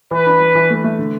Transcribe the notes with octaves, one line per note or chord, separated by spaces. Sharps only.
E3 B4
D4
E3
E3
A3
A3
D3